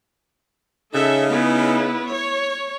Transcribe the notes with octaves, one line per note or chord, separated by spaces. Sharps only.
C#3 D#4 A4 E5
B3 E4 B4
C#5